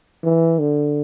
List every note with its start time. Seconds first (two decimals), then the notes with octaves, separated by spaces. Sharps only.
0.24 E3
0.59 D3